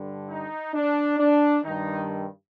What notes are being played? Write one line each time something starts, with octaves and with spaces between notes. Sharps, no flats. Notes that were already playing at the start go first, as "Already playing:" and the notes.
Already playing: G2 D3
D#4
D4
D4
G2 D#3 D#4